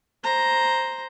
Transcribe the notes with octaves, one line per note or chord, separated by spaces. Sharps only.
C5 A#5